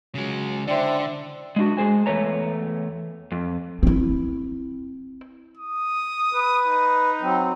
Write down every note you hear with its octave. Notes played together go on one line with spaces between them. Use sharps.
C#3 F#3 G#3
D3 E4 C5 D5 G5 C6
G#3 D4 F#4
G#3 G#4 C5 G#5
E2 G2 A3 B4 C#5 A#5
F2
C4 E4
D#6
B4
D#4
F#3 C4